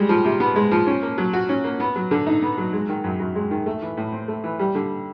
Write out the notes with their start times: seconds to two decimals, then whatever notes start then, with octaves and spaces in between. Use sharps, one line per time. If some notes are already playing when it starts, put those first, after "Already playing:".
Already playing: G3 G#3
0.09 F3
0.25 C3
0.40 B3
0.56 G#3
0.71 F3
0.87 C#4
1.02 A#3
1.18 F#3
1.33 F#4
1.49 C#4
1.64 A#3
1.80 B3
1.96 F#3
2.11 D3
2.27 D#4
2.42 B3
2.58 F#3
2.73 G#3
2.89 D#3
3.04 F#2
3.20 F#2
3.35 G#3
3.51 D#3
3.66 A3
3.82 E3
3.97 A2
4.12 C4
4.28 A3
4.44 E3
4.59 G3
4.75 D3